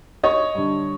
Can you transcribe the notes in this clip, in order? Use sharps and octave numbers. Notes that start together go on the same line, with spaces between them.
C#5 D#5
D3 G3